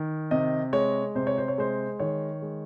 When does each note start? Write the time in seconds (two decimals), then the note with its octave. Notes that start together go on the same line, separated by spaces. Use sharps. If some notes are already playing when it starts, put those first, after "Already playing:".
Already playing: D#3
0.31 C3 D#5
0.73 G#3 C#5
1.15 C3 C5
1.27 C#5
1.38 C5
1.48 C#5
1.58 G#3 C5
1.99 D#3 C#5
2.42 G#3